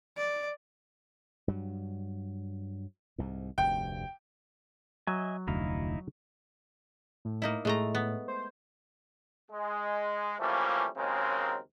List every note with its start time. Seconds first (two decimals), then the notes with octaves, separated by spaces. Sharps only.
0.17 D5
1.48 G2 F#3
3.18 C2 G#2
3.58 F1 D2 G2 G5
5.07 F#3 D#5 E5 G#5
5.48 F1 D2 D#4 E4 F5
7.25 A2
7.42 A#3 D#4 E4
7.65 A2 G#3 A3 A#5
7.95 B3
8.28 C5
9.50 G#3
10.39 E3 F3 G3 A3 A#3 C#4
10.96 D#2 C#3 F#3 G#3 C4 A#4